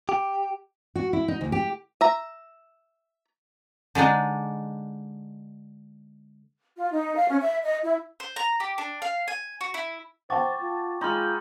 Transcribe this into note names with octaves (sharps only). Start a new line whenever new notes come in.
G4
F#4
E4
D#4
D2
G4
E5 A#5
D3 G#3 D4 D#4
F4
D#4
F5
C#4
E5
D#5
E4
C5
A#5
G4
D4
F5
G#5
F#4
E4
C5 F#5 G5 A5 C#6 D6 A6
F4
G#3 D#4 F4 B5 C6 F6